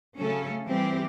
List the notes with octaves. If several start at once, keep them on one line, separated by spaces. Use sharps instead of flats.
C#3 F#3 A3 C#4 A4
E3 G3 C4 G4